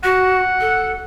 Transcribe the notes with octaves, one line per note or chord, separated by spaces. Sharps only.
F#4 F#5
A4